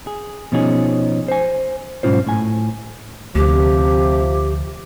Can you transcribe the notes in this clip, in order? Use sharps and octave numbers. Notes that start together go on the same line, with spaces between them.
G#4
B2 F3 C#4 D#4 G#4
C5 G#5
B1 G#2 B2 C#4 F4 C5
A2 G#5
D2 C3 F3 G4